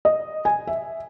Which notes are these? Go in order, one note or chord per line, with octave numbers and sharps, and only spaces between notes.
D#5
G#5
E5